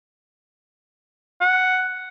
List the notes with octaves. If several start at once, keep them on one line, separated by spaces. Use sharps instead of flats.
F#5